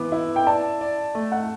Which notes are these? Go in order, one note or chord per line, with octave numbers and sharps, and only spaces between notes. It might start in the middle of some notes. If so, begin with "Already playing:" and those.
Already playing: E3 B3 D6
E4
G5
D5 A5
D5
A3
F#5